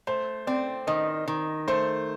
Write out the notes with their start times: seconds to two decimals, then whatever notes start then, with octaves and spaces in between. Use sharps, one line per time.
0.07 A3 C5
0.47 C4 D5
0.87 D#3 D#5
1.28 D#3
1.68 A3 C5